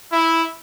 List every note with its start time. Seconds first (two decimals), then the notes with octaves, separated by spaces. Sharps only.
0.13 E4